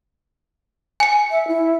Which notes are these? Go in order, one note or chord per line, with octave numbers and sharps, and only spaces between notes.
G#5 C#7
E5
E4